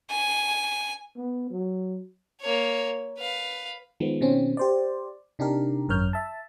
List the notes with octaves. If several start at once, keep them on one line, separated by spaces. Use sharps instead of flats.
G#5
B3
F#3
A#3 C#5
B4 F5
D#3 F3 G#3 B3
B2 D#3 C4 C#4
G4 C5 D5
C3 D4 D#4 G4 A#4
G#1 F#2 A#4 C#5 F6 G6
E5 A5